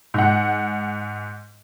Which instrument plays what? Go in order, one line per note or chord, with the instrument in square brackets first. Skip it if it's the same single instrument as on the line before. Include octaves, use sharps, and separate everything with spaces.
[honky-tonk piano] G#2 F#5